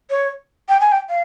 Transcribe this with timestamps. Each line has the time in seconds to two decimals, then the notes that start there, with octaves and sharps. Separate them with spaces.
0.10 C#5
0.69 G5
0.80 G#5
0.92 G5
1.09 F5